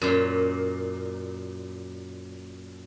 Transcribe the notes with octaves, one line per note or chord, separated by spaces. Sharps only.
F#2 A#2